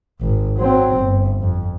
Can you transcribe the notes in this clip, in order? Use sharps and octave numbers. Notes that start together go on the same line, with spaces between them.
G#1
F#3 C4
G1
F2